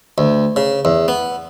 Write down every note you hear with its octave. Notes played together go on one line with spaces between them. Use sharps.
D2
C#3
E2
B3